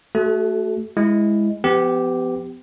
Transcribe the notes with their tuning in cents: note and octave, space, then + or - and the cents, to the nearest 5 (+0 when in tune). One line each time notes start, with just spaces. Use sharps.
A3 +0 F#4 +20 A4 -30
G#3 +0 E4 +0
F3 +0 B3 +35 G4 +0